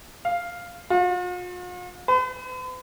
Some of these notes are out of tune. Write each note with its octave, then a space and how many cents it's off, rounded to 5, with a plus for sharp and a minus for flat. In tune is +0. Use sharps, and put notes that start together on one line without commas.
F5 +0
F4 +45
B4 +45